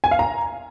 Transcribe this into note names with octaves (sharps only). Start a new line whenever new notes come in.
G#5
F5
A#5